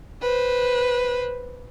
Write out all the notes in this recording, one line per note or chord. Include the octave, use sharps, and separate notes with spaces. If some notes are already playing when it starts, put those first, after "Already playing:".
B4 C5